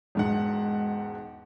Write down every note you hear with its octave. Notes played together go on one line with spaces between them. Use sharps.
E1 G#2 F#5